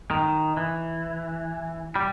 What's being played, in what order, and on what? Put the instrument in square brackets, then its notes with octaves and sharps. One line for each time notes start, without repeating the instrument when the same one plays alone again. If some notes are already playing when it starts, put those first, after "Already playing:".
[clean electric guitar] D#3
E3
G3